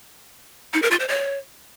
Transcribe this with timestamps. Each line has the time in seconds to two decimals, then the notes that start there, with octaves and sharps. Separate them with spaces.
0.74 D#4
0.82 A#4
0.91 F4
1.00 C5
1.08 C#5